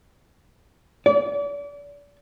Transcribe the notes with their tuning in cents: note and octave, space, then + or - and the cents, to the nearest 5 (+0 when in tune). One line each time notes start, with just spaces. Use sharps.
D5 -35